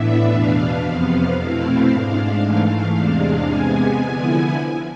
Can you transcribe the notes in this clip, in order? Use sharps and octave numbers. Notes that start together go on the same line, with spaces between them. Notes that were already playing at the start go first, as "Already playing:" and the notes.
Already playing: A2 E3 B3 D4 E5
E2 B2 B3 D4 F5
F2 C3 F3 B3
B2 A3 C4 E4 F5
G#2 G#3 D4
G#2 E3 A3
E2 C3 G#3 D4
C3 G#3 B3 G#5
D3 F3 B3 E4